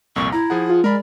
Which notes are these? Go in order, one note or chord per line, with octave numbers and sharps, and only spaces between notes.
C2 F2 A#2 C#6
E4 A#5
F3 G#4 F#5
F4
G#3 A#4 D5 B5